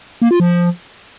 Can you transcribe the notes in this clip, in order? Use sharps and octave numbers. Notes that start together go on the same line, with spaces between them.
A#3
F4
F3